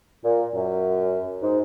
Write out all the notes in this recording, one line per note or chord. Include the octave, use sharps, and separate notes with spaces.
A#2
F#2
G#2